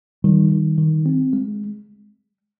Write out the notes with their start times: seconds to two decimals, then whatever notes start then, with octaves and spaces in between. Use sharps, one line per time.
0.24 D#3 G3
0.51 D#3
0.78 D#3
1.06 C4
1.33 G#3